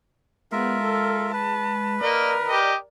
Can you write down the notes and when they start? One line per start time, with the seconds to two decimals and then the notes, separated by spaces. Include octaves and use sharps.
0.52 G#3 B3 F4 A#4 E5
0.82 A4
1.33 B4 A5
2.01 A#3 A#4 D5 D#5
2.48 G4 D#5